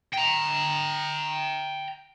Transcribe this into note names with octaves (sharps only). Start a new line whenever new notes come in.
G5 A#5